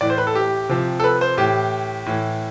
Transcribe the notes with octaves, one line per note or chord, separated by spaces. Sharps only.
A2 E3 D5
C5
B4
A4
G4
C3 F3
A4
B4
C5
A2 E3 G4
A2 E3